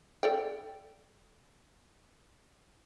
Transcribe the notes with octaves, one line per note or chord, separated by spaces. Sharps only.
A4 D5 G5